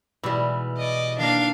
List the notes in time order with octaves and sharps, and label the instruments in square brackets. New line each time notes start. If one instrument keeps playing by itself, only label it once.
[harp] B2 G#3 E4 [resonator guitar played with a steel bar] E3 G3
[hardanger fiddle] D5 D#5
[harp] D#3 A#3 D5 [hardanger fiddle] D4 F5